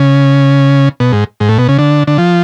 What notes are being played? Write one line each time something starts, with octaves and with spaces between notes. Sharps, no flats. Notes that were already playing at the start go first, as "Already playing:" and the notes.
Already playing: C#3
B2
G#2
G#2
A2
B2
C#3
D3
D3
F3